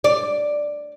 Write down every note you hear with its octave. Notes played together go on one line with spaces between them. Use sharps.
D5